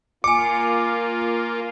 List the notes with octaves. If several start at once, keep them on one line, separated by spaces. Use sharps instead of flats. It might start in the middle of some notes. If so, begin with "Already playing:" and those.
A#3 F4 G#5 D6 C#7